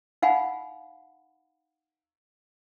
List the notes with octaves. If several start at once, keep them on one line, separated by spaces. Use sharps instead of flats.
D#4 F5 F#5 G#5 B5